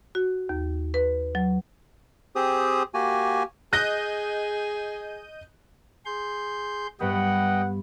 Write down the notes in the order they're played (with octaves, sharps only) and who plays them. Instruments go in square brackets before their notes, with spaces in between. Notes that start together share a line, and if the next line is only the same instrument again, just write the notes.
[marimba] F#4
D#2
B4
F#3
[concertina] C4 G4 G#4 C5 D#6
A#3 F#4 G4 G#5
[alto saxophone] G#4 [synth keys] D#5 G6 D#7 [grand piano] F#6 A#6
[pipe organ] G#4 C6 G6
[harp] G2 B3 [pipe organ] G3 D#5 G5 [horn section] F#5